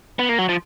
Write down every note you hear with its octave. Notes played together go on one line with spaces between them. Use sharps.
B3
A#3
F#3
F3